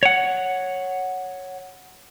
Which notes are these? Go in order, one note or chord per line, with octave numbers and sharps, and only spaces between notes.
C#5 F#5